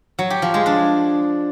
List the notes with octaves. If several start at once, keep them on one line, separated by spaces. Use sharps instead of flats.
F#3
G4
F3
G#3
D4